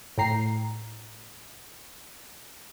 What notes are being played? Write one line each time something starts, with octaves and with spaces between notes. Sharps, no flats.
A2 G5 A#5 C7